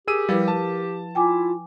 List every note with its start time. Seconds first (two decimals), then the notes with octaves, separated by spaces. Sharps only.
0.08 G4 G#4 A#4 E6 D#7
0.29 F3 G3 E4 B4
0.48 A5
1.15 E4 F4 G5 G#5 D6